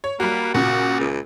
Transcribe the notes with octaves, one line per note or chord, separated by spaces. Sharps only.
C#5
G3 A#3 F#4
A#2 C#3 F#4
C#2